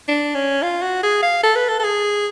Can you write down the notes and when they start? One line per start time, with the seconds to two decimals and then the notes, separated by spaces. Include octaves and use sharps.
0.08 D4
0.34 C#4
0.62 F4
0.82 F#4
1.03 G#4
1.23 F5
1.43 A4
1.56 B4
1.69 A4
1.80 A4
1.84 G#4